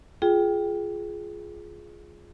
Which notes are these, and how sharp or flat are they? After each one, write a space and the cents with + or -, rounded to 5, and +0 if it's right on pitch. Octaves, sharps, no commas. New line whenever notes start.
F4 +0 G#4 +10 G5 +0